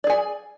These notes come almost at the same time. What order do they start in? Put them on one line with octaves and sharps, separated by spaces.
D5 G#4 G#5